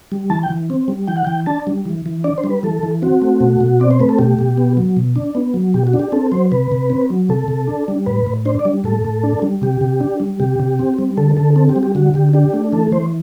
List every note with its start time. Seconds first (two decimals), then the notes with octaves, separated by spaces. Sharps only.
0.12 G3
0.30 E3 A5
0.43 G5
0.50 E3
0.70 C4
0.88 G3
1.08 E3 G5
1.17 F#5
1.24 E3 G5
1.46 D4 A5
1.67 G3
1.85 E3
2.06 E3
2.24 D4 D5
2.38 C5
2.44 G3
2.50 B4
2.63 E3 A4
2.83 E3
3.02 C4 F#4
3.22 A3
3.40 B2
3.61 B2
3.80 C4 D5
3.91 C5
4.00 A3 B4
4.09 A4
4.19 B2 G4
4.39 B2
4.57 B3
4.77 F#3
4.97 B2
5.16 D4
5.35 B3
5.54 F#3
5.74 B2 G4
5.87 F#4
5.93 D4
5.99 G4
6.12 C4 A4
6.32 F#3 C5
6.52 C3 B4
6.72 C3
6.90 C4
7.10 F#3
7.29 C3 A4
7.48 C3
7.68 D4
7.88 G3
8.06 A2 B4
8.26 A2
8.45 D4 C5
8.59 D5
8.65 G3
8.84 A2 A4
9.05 A2
9.24 D4
9.42 G3
9.62 C3 G4
9.81 C3
10.00 D4
10.20 G3
10.40 C3 G4
10.60 C3
10.79 C4
10.98 G3
11.17 D3 A4
11.37 D3 A4
11.56 C4 A4
11.69 G4
11.76 G3
11.83 G4
11.95 D3 F#4
12.14 D3 G4
12.33 D4 G4
12.54 A3
12.72 E3 A4
12.92 E3 C5